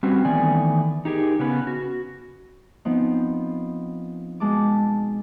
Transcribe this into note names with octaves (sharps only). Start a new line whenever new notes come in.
G3 C4 C#4 F#4 B4
D#3 E3 A3 B3 D5 G#5
D#4 G4 G#4 A#4
C#3 B3 C#4 B4
F#4
F3 B3 C4 D#4
B2 G#3 A5 D6